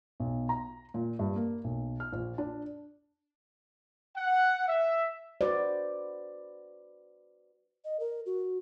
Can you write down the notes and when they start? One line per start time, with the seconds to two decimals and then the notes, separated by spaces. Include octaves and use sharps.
0.20 B1
0.49 A#5
0.94 A#2
1.19 G2
1.36 A#3
1.64 B1
2.00 F6
2.13 A#1
2.38 D4
4.16 F#5
4.68 E5
5.41 F#4 B4 C5 D5
7.85 D#5
8.00 A#4
8.26 F#4